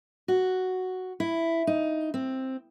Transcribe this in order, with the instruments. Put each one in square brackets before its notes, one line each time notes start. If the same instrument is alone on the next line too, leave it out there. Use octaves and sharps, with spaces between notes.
[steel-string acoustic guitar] F#4
E4
D#4
C4